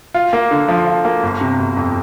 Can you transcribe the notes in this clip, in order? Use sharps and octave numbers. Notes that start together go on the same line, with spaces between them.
F4
A#3
D3
F3
F4
A#3
G1
C3
G1
F2